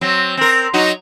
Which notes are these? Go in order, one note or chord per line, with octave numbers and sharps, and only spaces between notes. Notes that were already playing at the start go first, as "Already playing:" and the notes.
F#3 C4
C4 A#4
F#3 D#4 F#4